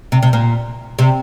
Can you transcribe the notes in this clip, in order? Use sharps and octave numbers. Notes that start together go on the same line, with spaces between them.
C3
C3
A#2
C3